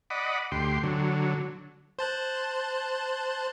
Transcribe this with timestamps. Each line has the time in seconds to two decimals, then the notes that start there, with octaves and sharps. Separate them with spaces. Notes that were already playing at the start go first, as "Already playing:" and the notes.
0.10 D5 D#5 F#5 B5
0.52 D2 G4 C6
0.84 D3 F#3
1.99 C5 A5 F#6